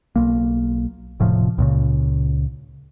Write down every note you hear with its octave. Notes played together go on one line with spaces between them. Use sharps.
B1 A#3
E1 A2 C3 F3
C#2 A#2 C#3